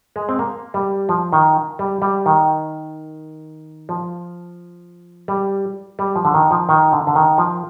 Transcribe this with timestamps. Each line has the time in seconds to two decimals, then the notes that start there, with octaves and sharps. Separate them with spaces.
0.16 G#3
0.29 C4
0.39 A#3
0.74 G3
1.09 F3
1.32 D#3
1.79 G3
2.02 G3
2.26 D#3
3.89 F3
5.28 G3
5.99 G3
6.16 F3
6.25 D3
6.34 D#3
6.51 F3
6.69 D#3
6.93 D3
7.07 D3
7.15 D#3
7.38 F3